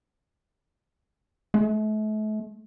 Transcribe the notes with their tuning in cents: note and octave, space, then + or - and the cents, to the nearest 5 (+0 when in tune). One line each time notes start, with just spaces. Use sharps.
A3 -40